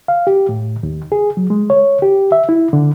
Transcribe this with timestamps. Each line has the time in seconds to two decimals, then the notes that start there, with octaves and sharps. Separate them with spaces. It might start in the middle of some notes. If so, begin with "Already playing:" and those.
0.08 F5
0.27 G4
0.49 A2
0.83 D#2
1.12 G#4
1.37 F#3
1.50 G#3
1.70 C#5
2.02 G4
2.32 E5
2.49 E4
2.73 D3